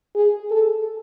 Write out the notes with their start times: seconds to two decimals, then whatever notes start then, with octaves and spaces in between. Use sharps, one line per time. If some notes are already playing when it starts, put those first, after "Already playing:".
0.16 G#4
0.51 A4